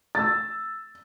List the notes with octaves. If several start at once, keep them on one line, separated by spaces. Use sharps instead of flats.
E6 A6